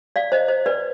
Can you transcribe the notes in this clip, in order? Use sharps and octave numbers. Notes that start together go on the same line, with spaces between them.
D5 F5
C5 D#5
C5
B4 D5